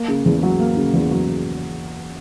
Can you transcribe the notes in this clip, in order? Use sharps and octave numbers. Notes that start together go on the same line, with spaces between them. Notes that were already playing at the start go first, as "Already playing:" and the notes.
Already playing: A#3
C#3
E2
F#3
A#3
C#3
E2
F#3